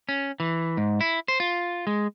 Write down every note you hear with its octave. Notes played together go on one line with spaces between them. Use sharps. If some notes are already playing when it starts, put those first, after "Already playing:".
C#4
E3
G#2
E4
C5
F4
G#3